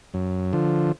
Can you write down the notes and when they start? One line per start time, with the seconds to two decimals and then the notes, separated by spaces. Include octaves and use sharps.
0.14 F#2
0.53 D3 F3